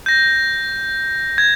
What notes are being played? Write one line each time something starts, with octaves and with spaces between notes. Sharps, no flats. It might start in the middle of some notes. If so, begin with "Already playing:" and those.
G6 A#6
G#6